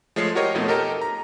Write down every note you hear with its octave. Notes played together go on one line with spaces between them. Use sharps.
F3 G#3 A3 C#5 C7
F#4 G4 A#4 C#5 D#5
F2 B2 F3 A3 D#4
G4 A4 A#4 D#5 A#5
A#5